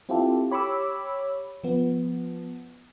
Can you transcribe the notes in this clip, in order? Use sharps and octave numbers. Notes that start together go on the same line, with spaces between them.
C4 E4 F4 G4 A4
G4 C#5 B5 C#6 D6 E6
F3 B3